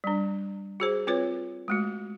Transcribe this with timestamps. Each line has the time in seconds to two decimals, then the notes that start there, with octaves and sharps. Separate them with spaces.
0.04 G3 D4
0.80 F#4 G#4 C5
1.07 C4 F4 B4 C#5
1.68 G#3 A3 F#4